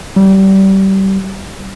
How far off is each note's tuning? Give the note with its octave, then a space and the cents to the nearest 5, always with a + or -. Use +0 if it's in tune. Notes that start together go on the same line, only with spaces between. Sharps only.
G3 -25